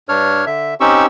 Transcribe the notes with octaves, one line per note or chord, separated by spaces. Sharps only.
G2 D4 C#5 F6
D3 E5
C4 C#4 D#4 G4 C#6 E6